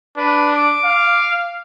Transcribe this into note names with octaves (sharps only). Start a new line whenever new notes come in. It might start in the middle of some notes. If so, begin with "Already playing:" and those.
D4 B4
D6
F5